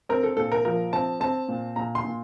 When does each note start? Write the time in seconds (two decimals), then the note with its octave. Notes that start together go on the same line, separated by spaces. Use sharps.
0.09 C4 A#4
0.23 A4
0.37 A#2 A4
0.52 A#4
0.65 F3 A#4
0.93 C4 A5
1.20 C4 A5
1.48 A#2
1.76 A#2 A#5
1.95 C6
2.05 A#2